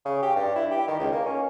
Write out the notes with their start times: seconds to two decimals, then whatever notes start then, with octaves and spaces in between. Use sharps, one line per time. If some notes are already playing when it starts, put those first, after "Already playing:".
0.05 C#3
0.23 G4
0.36 G2
0.56 E4
0.71 G4
0.88 D#3
1.00 C#2
1.12 A#3
1.25 C#4